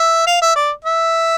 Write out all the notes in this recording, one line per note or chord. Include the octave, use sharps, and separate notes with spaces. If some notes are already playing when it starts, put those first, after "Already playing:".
Already playing: E5
F5
E5
D5
E5